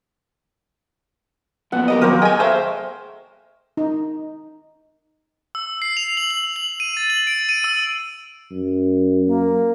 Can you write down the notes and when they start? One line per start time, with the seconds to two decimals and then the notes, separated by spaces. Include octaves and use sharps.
1.72 F#2 A#2 B3 F#5
1.88 G4 A#4 D#5
2.02 D#2 F#3 A#3 C4 A#4
2.22 G#4 D#5 G5 G#5
2.40 A3 C5 E5 F5
3.77 D#4
5.55 E6
5.82 C7
5.97 F7
6.17 F#7
6.31 F#7
6.56 F#7
6.80 D#7
6.97 A6
7.10 F#7
7.27 D7
7.49 D#7
7.64 E6
8.51 F#2
9.27 A#3